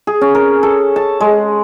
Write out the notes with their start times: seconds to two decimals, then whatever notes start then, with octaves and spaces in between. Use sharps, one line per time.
0.07 G#4
0.21 C#4
0.35 A#4
0.63 A4
0.96 A5
1.20 G#3